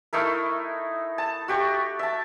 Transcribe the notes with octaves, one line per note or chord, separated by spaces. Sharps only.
A3 D#4 E4 A#4
A5
F#4 G4 C#6
E5 A5